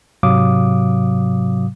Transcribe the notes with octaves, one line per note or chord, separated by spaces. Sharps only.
G#2 C3 F#3 F5 D6 D#6